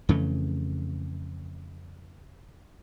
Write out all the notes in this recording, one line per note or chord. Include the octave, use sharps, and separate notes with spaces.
F2 C#3 E3 A3